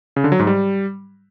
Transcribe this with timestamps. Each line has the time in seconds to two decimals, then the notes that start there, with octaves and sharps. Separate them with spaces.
0.16 C#3
0.24 D3
0.32 F#3
0.39 G#2
0.47 G3